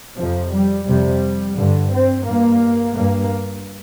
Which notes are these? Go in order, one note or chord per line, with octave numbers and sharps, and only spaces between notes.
F2 C3 F3
G3
F2 C3 G3
G2 D3
C4
G2 A#3
G2 A#3